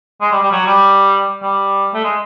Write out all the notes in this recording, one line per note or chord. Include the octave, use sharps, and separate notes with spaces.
G#3
G3
G3
F#3
G3
G3
A3
G#3